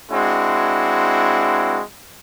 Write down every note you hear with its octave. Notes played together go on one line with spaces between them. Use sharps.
G#3 C4 D4 E4 F#4